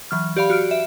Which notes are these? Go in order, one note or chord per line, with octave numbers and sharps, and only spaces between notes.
E3 F#3 F6
G4 D5 F5 B5
F#4 F6 D7
E5